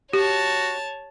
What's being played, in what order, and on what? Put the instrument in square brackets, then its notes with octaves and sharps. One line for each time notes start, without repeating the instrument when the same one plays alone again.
[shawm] F#4 [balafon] G4 [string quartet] C#5 A5